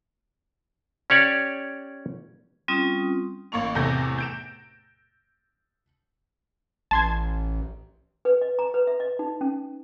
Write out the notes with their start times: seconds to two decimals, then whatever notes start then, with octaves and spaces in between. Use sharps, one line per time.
1.10 C#4 G4 C#5 D5
2.68 G3 C4 C#4 F4 D#6
3.52 A1 A#3 C#6 F7
3.75 E2 A2 C3 A3 G6 A#6
4.18 G6 D7 E7
6.91 A1 A5 C6 G#6
8.25 B4
8.42 D#5
8.59 A#5
8.74 B4
8.87 E5
9.00 D#5
9.19 D#4
9.41 C#4